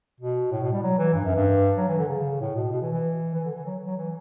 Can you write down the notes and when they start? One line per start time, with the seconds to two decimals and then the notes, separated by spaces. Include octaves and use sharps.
0.20 B2
0.52 A2
0.63 B2
0.73 G3
0.83 F#3
0.98 E3
1.15 G2
1.25 F#2
1.35 G2
1.78 F#3
1.88 E3
1.99 D3
2.09 C#3
2.41 A2
2.55 B2
2.72 B2
2.82 E3
2.93 E3
3.34 E3
3.45 D3
3.55 E3
3.66 F#3
3.87 F#3
3.97 E3